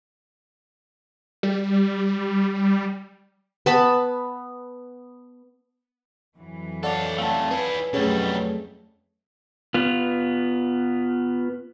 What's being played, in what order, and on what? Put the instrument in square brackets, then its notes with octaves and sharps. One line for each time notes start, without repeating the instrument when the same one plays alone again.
[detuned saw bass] G3
[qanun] B3 A5 B5
[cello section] F2 E3 F#3
[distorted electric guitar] A4 F5 [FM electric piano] C#5 D5 F#5
[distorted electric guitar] C3 A3 [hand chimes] F5 A5
[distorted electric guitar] E4 G#4 [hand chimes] B4
[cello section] F2 F#3 A3 [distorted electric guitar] B2 G3 [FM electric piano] C#4 G#4 C#5
[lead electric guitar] B3 F4